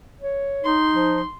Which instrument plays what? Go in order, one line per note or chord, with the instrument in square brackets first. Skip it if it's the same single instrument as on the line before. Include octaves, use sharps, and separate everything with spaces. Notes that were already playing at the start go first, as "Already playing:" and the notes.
[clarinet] C#5
[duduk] D#4 [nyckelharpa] C6
[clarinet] F3